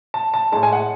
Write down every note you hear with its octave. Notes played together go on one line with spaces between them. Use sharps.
A5
A5
A2 G#3 A5
G#5
F#5